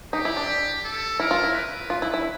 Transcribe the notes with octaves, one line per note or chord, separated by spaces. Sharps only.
D#4 G4
E4
D4
A4
E4 A#4
F4
E4
B4
F4
E4
E4